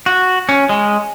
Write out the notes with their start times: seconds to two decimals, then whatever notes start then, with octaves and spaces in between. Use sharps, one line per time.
0.06 F#4
0.49 C#4
0.69 G#3